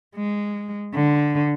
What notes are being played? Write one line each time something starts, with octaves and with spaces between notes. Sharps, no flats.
G#3
D3